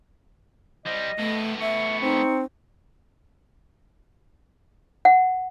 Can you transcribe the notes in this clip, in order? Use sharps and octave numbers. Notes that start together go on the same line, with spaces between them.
G3 C5 D#5
A2 A3 B3
E5 C#6
C4 D#4
F#5